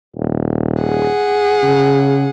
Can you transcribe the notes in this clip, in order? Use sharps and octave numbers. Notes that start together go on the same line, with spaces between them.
D#1
G#4 F#5
C#3